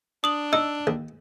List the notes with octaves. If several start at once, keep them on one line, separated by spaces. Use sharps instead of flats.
D4 D#6 F#7
D#4 E6
D#2